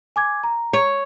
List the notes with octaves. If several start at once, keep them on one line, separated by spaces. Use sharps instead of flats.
G#5 D6 G#6
A#5
C#5